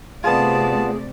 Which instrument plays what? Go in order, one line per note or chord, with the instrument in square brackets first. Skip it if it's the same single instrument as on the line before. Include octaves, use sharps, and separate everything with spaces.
[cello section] C3 A3 D5 [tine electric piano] B3 F4 [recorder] G#4 [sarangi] A5